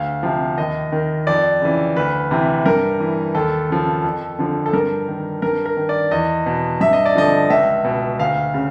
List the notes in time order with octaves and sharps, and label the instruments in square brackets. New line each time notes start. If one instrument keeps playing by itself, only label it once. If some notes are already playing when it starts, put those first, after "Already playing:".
Already playing: [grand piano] D2 F5
C3 F3
D#2 D#5
D#3
F2 D5
C#3 E3
D2 B4
C3 E3
G2 A#4
E3
D#2 A4
C#3 F3
F2
D3 F3
A4
G2 A#4
D#3
G2 A#4
A#4
D#3
D5
E2 D#5
B2
G2 E5
D#5
D5
D3 F3 D#5
C#2 E5
B2
D2 F5
C#3